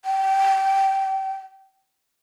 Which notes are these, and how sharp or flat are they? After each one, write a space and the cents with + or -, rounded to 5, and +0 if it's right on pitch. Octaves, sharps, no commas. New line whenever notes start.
G5 -20